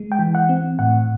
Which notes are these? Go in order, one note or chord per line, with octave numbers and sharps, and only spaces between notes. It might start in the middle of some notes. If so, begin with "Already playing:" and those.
Already playing: G#3
G5
E3
F#5
C4
A2 F#5